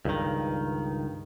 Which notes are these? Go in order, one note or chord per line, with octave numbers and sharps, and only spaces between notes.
C#2 G2 D#3